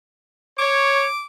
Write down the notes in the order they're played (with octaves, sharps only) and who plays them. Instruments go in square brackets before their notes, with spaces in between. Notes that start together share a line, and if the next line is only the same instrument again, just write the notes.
[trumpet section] C#5 [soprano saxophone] D6